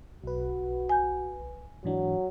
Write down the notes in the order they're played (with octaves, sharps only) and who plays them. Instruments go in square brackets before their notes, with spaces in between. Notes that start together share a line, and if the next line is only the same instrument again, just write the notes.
[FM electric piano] B1 B4 [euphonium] F#4
[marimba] G#5 G6
[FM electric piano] G#2 E3 D4 [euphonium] F#3